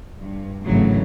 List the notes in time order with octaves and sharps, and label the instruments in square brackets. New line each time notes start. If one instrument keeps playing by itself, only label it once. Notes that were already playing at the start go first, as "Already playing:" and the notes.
[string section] G2
G#1 A2 C#3 E3 F#3